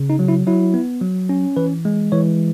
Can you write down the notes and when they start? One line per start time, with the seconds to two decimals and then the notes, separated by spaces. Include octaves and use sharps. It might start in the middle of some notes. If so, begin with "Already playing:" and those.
Already playing: C#3
0.10 D#4
0.19 F#3
0.28 E4
0.47 F#3 E4
0.74 B3
1.01 F#3
1.29 C#4
1.57 E3 B4
1.85 G#3
2.12 E3 C#5